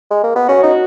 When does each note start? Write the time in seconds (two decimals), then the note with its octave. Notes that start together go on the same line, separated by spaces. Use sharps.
0.11 G#3
0.23 A#3
0.35 B3
0.48 C#4 F#4
0.63 D#4